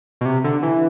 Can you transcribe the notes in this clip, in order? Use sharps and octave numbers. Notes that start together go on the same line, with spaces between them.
B2
C3
D3
E3